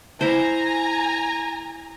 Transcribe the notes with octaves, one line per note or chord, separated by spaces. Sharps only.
E4 C5 G#5 A#5